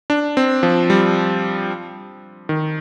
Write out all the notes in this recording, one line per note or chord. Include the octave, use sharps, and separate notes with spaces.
D4
C4
F3
G3
D#3